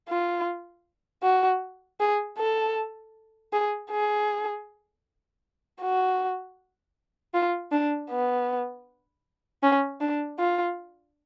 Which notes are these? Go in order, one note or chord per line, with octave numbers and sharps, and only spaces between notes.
F4
F#4
G#4
A4
G#4
G#4
F#4
F4
D4
B3
C#4
D4
F4